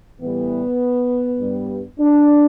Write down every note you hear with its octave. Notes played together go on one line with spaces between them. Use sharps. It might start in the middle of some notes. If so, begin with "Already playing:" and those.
A2 E3 G3 B3
G2 G3
D4